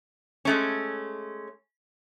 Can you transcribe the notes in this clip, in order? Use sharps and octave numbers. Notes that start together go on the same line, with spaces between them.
G#3 A3 C#4